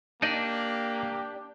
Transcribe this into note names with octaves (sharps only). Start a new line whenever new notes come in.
A#3 D4 D#4 G4 D5 D#5